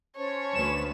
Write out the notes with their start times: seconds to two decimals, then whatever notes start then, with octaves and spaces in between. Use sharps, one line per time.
0.16 C#4 C5 C#5 A5
0.54 D2 B4 E7